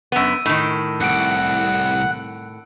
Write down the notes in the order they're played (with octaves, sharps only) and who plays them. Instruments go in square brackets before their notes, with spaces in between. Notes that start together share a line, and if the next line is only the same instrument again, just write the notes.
[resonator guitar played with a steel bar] F#2 B3 [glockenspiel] E6 D#7
[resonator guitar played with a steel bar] A2 D#3
[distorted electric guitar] C2 F2 [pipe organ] F#5 [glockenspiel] C#7 D7